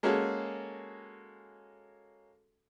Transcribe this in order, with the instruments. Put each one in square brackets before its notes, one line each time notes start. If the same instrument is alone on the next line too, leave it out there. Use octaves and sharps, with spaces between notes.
[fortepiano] G#3 A#3 C#4 F#4 G#4 A4